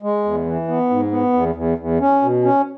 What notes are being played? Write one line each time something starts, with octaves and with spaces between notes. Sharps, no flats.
G#3
E2
E3
B3
G#2
B3
E2
E2
E2
C#4
B2
C#4